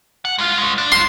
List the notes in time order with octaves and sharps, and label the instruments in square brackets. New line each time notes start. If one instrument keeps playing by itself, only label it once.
[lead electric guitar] F#5
G#3 F5
G#3 C#5
D4
[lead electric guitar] F4 C5 [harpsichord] C6